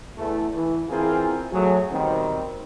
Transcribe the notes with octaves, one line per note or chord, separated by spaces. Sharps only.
E2 A3
E3
E2 E3 C4 F4 G#4 A#4
F#3 A3 G#4
B2 D#3 G3 C4